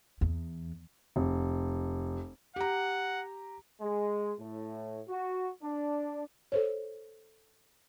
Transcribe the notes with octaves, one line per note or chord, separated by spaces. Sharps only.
E2
F1
G4 F#5 A#5
G#3
A2
F#4
D4
A4 C5 C#5